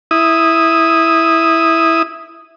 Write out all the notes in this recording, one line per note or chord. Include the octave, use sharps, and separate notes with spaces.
E4 D#6